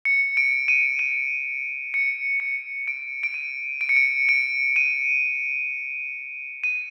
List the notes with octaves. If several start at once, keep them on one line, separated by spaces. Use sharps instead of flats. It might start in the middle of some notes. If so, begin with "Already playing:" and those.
C#7
D7
D#7
D#7
C#7
C#7
D7
D7
D#7
D7
C#7
D7
D7
D#7
D#7